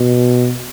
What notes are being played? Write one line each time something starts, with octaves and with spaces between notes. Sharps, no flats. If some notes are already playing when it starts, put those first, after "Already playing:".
Already playing: B2